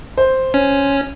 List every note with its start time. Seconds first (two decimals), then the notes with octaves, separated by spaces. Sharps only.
0.18 C5
0.54 C#4